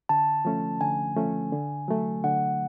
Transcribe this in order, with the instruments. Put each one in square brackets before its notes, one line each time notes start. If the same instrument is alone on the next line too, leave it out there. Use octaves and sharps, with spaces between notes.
[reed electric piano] D3 [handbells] A5
[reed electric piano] F3 A3 C#4
[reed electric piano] D3 [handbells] G#5
[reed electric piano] F3 A3 C#4
D3
F#3 A3
[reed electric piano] D3 [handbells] F#5